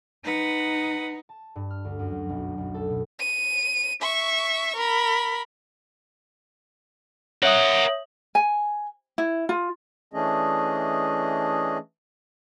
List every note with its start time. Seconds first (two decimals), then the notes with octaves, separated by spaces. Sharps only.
0.24 D#4 B4 F#5
1.29 A5
1.56 G2
1.70 F6
1.85 D2
1.99 F#2
2.11 F#3
2.29 B1
2.58 B1
2.74 A4
2.90 B2
3.20 D#7
4.01 E5 C#6
4.76 A#4 B5
7.43 A#4 C#5 E5 F#5 D#6
8.35 G#5
9.18 E4
9.49 F4
10.13 E3 A3 C#4 D4 G#4 D#5